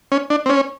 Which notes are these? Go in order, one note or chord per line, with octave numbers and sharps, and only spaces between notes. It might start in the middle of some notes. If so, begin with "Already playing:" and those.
C#4
D4
C4
C#4